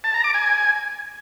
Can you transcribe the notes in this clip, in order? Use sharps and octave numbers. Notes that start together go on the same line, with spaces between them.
A5
A#5
D6
G#5